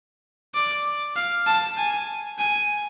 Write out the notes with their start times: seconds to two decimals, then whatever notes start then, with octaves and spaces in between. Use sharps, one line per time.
0.54 D5
1.16 F5
1.47 A5
1.77 G#5
2.38 G#5